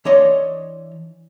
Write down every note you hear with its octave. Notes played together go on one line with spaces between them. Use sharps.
E3 D4 C#5 D#5 C6